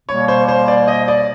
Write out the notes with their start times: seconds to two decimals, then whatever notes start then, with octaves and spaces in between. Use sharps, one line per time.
0.08 B2 G3 A#3 C#5
0.28 C5
0.48 C5
0.68 D5
0.88 D#5
1.08 D5